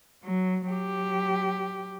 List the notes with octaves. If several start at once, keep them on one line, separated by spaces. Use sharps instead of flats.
F#3
F#3 G4